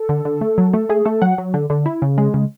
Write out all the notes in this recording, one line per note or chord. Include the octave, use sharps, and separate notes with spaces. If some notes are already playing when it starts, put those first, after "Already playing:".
Already playing: A4
D3
D3
A3
F#3
A3 A4
A3 G#4
A3 A4
F#3 F#5
F#3
D3
D3
E4
C#3
G#3
C#3